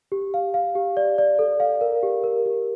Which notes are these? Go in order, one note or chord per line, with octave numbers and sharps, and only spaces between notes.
G4
F5
F5
G4
D5
D5
A4
F5
A#4
G4
A#4
G4